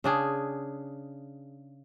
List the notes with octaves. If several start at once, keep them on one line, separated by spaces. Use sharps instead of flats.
C#3 D4 G#4